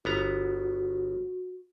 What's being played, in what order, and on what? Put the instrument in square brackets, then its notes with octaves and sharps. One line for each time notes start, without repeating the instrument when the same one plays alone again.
[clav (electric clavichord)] G1 B3 A#5 [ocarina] F#4